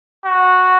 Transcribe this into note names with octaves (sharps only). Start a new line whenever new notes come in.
F#4